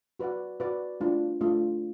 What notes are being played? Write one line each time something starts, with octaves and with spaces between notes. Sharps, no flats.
F#4 B4 D5 F#5
F#4 B4 D5 F#5
A3 D4 F4
A3 D4 F4